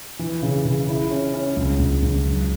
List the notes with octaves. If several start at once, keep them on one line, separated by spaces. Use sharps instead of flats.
E3
C#3
C#3
E4
C#4
C#4
C#2
C#2
C#2
F#3